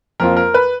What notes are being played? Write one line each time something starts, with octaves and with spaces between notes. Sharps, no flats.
F2 F3 A#3 F4 A#4
A#4
B4